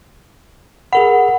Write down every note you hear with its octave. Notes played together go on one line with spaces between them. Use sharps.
G#4 A#4 F#5 B5